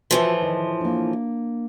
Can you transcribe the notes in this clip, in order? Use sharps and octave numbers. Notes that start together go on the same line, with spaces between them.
A2 E3 F3 F4 F#4 B4
D#3
A#3 D4